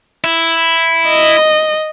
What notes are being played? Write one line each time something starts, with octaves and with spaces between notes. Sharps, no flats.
E4
D#5